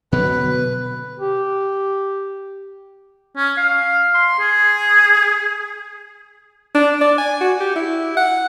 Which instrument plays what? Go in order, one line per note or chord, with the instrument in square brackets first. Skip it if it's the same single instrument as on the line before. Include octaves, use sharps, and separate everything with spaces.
[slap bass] B2 D3 F#3 [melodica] B4
[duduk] G4
[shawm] C#4
F5
C6
G#4
[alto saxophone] D4
D5
G#5
F#4
G4
E4
F#5